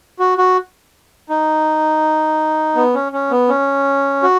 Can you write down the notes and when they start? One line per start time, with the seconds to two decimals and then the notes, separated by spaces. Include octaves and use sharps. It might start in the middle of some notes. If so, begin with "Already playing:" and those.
0.19 F#4
0.38 F#4
1.29 D#4
2.76 B3
2.95 C#4
3.12 C#4
3.31 B3
3.49 C#4
4.23 F#4